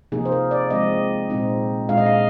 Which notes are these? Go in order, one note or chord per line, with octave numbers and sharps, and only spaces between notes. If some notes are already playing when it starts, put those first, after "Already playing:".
C3 F3 A#3 D#4 G#4
C5
A#4
D5
F3 G#3 C4 D#5
A#2 G#3 C4 D#4
A#2 G#3 D4 F5
D#5
F5